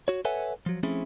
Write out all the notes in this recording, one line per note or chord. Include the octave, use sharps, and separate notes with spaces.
F#4 C#5
A4 B4 C#5 E5 F#5 G#5
F3 F#3
F3 A3 C4 C#4 E4 G#4